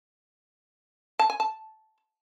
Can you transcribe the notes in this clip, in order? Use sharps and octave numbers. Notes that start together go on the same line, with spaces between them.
A5
G#5
A5